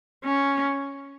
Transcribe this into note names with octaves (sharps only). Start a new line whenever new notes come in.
C#4